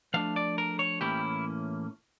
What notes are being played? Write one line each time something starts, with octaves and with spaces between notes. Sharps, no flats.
F3 A3 D4 F5
D5
A#4
C#5
A2 E3 A#3 C#4 E4 G4